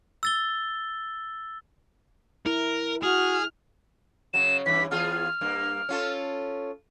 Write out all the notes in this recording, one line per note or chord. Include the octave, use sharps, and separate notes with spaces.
E6 A6 G7
E4 A#4
F#4 G#4 F6
C#3 F#3 E7
G2 E3 B6
E2 F4 G#4 F6
G2 A#3
C#4 F4 A4